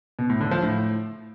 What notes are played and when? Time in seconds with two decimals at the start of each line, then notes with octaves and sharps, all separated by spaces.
0.19 B2
0.30 A2
0.40 D3
0.51 F3
0.62 A2